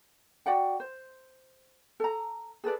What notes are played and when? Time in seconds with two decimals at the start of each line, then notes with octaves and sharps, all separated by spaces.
0.46 F#4 D5 F#5 G5
0.80 C5
2.00 A4 A#5
2.64 G#4 A4 B4 D5